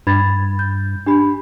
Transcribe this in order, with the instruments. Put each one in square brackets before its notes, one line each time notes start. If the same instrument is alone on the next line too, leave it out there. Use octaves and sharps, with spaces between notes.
[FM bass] G2 [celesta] B5 G#6 A6
[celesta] G6
D4 G4 B5